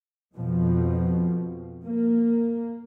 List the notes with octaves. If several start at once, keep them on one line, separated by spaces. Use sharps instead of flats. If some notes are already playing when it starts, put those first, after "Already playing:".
F2 B2 F3
A#3